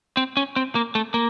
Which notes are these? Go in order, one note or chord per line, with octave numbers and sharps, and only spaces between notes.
C4
C#4
C4
A#3
A3
A#3